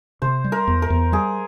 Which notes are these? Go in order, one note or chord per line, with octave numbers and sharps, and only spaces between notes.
C3 C5
G3
A#4
E2
A#4
E2
G3 G#4